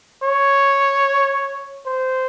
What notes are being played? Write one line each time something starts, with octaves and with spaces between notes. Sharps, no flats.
C#5
C5